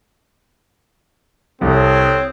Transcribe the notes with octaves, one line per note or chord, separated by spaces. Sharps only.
C2 C4 A4 C#5 D#6